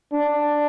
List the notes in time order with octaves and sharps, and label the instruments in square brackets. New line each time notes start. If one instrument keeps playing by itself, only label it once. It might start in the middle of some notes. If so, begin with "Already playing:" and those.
[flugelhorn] D4